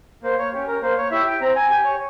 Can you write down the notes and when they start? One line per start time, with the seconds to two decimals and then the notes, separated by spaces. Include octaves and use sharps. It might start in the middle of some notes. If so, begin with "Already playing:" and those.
0.23 A#3 C5
0.38 C#5
0.53 C#4 G4
0.68 A#4
0.82 A#3 C5
0.97 C#5
1.11 E4 G4 E5
1.27 G5
1.41 C4 A#5
1.56 G#5
1.70 G4 G#5
1.85 C#5